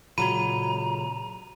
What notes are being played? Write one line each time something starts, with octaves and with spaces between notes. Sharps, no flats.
A#2 C#3 F#3 F#4 A#5 B5 D#7